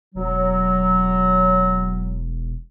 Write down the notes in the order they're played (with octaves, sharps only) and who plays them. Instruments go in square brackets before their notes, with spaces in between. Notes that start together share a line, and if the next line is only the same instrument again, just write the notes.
[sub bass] E1 [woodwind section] F#3